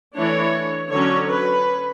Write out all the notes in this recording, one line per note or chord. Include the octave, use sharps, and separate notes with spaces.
E3 A3 D4 C#5
D3 F#3 C#4 C#5
B4